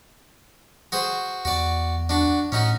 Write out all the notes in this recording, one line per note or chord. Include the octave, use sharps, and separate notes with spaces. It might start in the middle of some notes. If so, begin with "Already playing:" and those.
F#4 G#4 C5
E2 F#4 D5
D4 F#4
A2 C#4 D#4 F#4